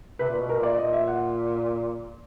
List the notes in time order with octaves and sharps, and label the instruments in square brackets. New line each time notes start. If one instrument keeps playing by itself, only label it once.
[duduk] C3 [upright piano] B4
[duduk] A#2
[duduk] B2 [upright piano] B4
[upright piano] A#4
[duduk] A#2
[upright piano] D5
[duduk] A#2 [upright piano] D#5
[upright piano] E5
F#5